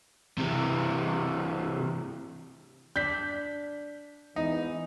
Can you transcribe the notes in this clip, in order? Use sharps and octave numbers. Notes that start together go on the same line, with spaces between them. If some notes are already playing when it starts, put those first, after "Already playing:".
C3 E3
D4 G6 B6
E2 G#2 E3 D#4